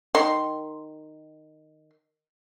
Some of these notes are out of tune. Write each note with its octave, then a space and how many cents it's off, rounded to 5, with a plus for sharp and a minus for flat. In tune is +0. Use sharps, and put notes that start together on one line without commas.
D#3 -10 C6 +0